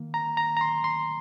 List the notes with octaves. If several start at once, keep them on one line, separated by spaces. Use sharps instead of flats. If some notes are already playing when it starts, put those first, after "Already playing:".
Already playing: D#3 A#3
A#5
A#5
A#5
C6
C6